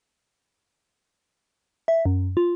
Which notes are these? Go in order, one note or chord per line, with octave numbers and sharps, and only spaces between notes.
E5
F#2
F4